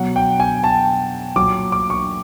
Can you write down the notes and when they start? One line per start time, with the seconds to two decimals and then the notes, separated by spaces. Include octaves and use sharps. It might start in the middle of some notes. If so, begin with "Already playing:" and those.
Already playing: B2 F#3 F#5
0.16 G5
0.40 G#5
0.64 A5
1.36 A#2 F#3 D6
1.72 D6
1.90 C#6